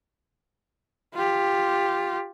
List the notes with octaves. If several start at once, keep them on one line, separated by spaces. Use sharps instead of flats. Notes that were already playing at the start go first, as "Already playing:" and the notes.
F4 G4